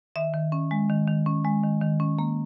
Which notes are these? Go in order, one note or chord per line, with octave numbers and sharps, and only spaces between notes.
D#3 E5
D#3
C#4
G#3
D#3
D#3
C#4
G#3
D#3
D#3
C#4
A#3